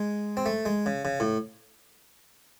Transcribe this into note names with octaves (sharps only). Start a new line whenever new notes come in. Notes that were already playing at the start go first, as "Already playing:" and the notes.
Already playing: G#3
C4
A3
G#3
C#3
C#3
A2